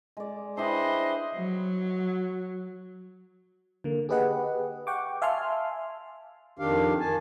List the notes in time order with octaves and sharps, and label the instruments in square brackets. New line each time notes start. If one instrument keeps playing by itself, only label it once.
[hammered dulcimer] G#3 D5
[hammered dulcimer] D4 E4 G4 [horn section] B4 C5 D#5
[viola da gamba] F#3
[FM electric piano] D3 A#3
G4 G#4 B4 D#5 F#5
F#5 G5 C#6 D6
E5 F5 G#5 A5 C6 F6
[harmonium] F2 D#3 D4 G4 F5
D#3 G#5 A5